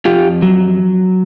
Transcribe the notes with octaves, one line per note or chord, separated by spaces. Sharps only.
F2 F4 G4
F#3